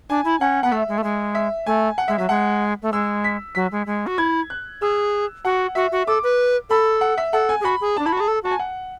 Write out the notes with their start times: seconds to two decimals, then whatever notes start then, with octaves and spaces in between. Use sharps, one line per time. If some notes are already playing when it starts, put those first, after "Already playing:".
0.10 D4 G#5
0.25 E4
0.40 C#4 F#5
0.63 B3 F#5
0.72 A3 E5
0.88 G#3
0.98 A3
1.04 G#3
1.35 E5
1.66 A3 G#5
1.98 F#5
2.08 G#3 E5
2.18 F#3 E5
2.29 G#3 F#5
2.82 A3
2.92 G#3 E6
3.24 B6
3.55 F#3 B6
3.72 G#3
3.87 G#3
4.07 F#4
4.18 E4 G#6
4.50 F#6
4.81 G#4 E6
5.45 F#4 F#5
5.75 F#4 E5
5.92 F#4
6.07 A4 D6
6.23 B4
6.70 A4 B5
7.01 F#5
7.18 E5
7.33 A4 F#5
7.49 G#5
7.60 G#4
7.64 F#4 B5
7.81 G#4
7.97 D4 A5
8.06 E4 B5
8.12 F#4
8.17 G#4 A5
8.28 A4
8.43 F#4 A5
8.51 G#5
8.59 F#5